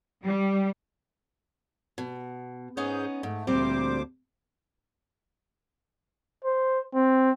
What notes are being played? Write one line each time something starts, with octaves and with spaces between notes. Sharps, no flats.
G3
B2
G#2 B3 C#4 D#4 G#4 G6
G#2 A3
D2 A#2 G3 C4 C5 D6
C5
C4